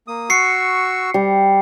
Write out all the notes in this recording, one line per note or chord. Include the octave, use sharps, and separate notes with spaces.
A#3 D#6
F#4 C#6 E6 C7 C#7
G3